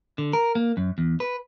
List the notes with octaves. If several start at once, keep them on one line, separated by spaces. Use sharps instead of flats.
D3
A#4
A#3
F#2
E2
B4